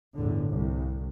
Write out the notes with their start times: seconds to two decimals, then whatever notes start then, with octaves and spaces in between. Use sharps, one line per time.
0.16 G1 E2 A2 D3
0.48 C2